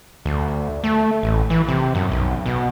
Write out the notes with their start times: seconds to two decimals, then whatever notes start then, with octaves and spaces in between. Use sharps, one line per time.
0.26 D2
0.84 A3
1.23 A1
1.50 E3
1.69 C3
1.95 F#2
2.11 B1
2.46 B2